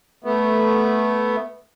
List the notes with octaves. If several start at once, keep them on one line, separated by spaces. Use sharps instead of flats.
A3 B3